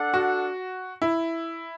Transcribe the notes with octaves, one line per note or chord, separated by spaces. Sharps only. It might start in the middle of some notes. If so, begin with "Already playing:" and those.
Already playing: D4 A4 F#5
F#4
E4